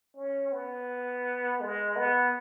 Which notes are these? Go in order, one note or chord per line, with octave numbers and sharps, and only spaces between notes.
C#4
B3
G#3
B3